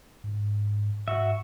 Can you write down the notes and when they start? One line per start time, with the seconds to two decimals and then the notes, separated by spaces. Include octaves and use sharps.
0.24 G#2
1.08 G#2 F#4 E5